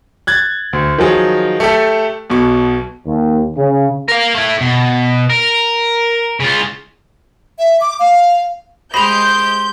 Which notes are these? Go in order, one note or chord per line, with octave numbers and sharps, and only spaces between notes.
F#6 G#6 A6
D2
D#3 F3 F#3 G#4
A3 G4 A4
B1 B2 C#6
D#2
C#3
A#4 F5
A3 E4
B2
A#4
C#3 F4
E5
D6
F5
G#3 G4 C5 D#5 B5 G6 F7